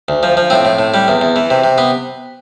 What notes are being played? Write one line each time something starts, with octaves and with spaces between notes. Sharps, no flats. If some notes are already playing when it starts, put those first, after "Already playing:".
D2
F3
F3
A2 C4
A2
A2
G3
E2
E2
E3
C3
C3
B3